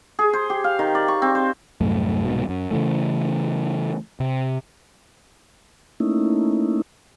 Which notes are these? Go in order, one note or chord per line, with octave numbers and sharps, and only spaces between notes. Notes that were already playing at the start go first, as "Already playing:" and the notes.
G#4
C5
G4
F5
D#3
D5
C#6
C4
C5
C2 F#2 A2 A3
C2 G#2 B2
F#2
C#3 E3 A3
C3
A3 A#3 C#4 D#4 E4